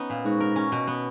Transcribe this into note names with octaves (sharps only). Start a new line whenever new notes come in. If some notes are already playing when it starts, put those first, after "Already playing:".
Already playing: B3 C#4 D#4
A#2
G#2 F#4
A#4
C#4
B2
B3